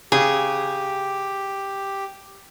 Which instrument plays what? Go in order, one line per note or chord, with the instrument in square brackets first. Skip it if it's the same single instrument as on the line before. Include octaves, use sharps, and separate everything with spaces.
[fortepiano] C#3 [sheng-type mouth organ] G4 [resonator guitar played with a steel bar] G#4